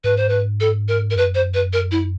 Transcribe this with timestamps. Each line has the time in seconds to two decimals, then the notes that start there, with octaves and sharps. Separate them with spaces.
0.04 G#2 B4
0.17 C5
0.29 B4
0.60 A4
0.88 A#4
1.11 A#4
1.16 F#2 B4
1.35 C5
1.54 B4
1.73 A#4
1.91 E4